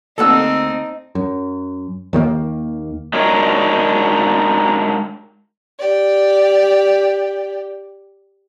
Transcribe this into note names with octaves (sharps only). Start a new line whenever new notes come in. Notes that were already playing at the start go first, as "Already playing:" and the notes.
D2 A#3 C4 D#4 A4 F#5 E6
F#2
D#2 D#3 G#3 A#3
G#3 D4 D#4 F#4 A#4 C#5
G4 D5